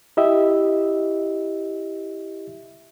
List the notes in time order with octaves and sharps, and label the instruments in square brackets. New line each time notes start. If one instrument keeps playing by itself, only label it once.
[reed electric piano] E4 G4 D#5 E5